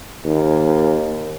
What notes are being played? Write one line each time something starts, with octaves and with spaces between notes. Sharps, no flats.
D#2